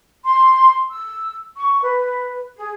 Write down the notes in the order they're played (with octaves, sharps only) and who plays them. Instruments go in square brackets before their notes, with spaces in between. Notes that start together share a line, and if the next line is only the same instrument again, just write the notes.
[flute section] C6
E6
C#6
B4
G#4